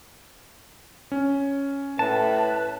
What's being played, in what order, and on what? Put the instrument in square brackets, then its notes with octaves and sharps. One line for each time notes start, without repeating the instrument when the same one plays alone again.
[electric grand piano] C#4
[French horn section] A2 [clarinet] B4 [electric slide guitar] A5